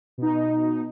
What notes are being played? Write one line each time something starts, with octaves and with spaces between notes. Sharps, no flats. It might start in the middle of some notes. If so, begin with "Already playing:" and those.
B2 D#4